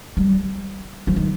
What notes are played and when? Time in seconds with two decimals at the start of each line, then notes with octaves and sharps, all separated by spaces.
0.17 G3
1.07 F3
1.16 D#3